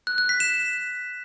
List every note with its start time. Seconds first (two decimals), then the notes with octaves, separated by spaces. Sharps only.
0.07 F#6
0.18 F#6
0.29 B6
0.40 E7